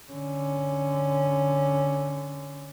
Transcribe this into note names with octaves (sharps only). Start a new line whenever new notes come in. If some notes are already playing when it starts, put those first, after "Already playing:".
D3 C#4